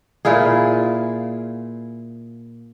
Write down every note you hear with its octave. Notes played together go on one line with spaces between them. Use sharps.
A#2 E4 F4 G#4